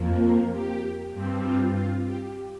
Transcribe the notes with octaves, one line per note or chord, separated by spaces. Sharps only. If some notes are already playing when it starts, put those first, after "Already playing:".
Already playing: F2 F3 A#3
A#4
G4
G2 G3 C4
F4
F4
G4